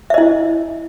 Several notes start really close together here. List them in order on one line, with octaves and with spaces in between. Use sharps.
E5 D#5 E4